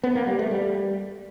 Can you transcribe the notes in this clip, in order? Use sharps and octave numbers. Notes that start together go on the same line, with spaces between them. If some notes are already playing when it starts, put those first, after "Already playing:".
B3
A#3
G3
A3
G3